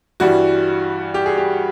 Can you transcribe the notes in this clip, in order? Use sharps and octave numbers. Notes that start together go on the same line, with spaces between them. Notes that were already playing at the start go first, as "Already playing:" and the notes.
G2 E3 G3 F#4
G4
G#4
G4